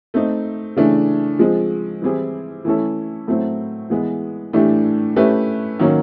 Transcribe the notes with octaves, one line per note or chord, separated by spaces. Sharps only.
A3 C4 D#4
C#3 E3 A3 D4
F3 G#3 C4
E3 G3 C4 E4 G#4
E3 A3 C#4 E4 A4
A2 F#3 A3 C4 E4
E3 G#3 B3
A2 E3 A3 D4 G4
A3 C#4 E4 G4 B4
D#3 F#3 A#3 C#4